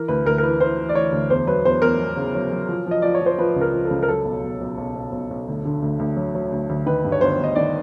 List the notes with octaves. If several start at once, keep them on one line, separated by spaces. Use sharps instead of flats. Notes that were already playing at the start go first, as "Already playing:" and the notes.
Already playing: E3 A#4
D2 B4
D2 A#4
A#4
E3 B4
E3 C5
E3
D5
E3 C#5
D2
E2 C5
F#3 B4
E2 C5
E2 A#4
F#3
C#3
F#3
F#3
F3
F3 D#5
F3 D5
C#5
F3
C5
F3 B4
C#2
A#4
F3
A4
C#2
A#4
F#3 A4
B1
B1
B1
B1
B1
B1
B1
D2
D3
D2
D2
F#3
F#3
D2
D2
D#3 B4
G2
C#5
G1 C5
G1
D#5
D#3 D5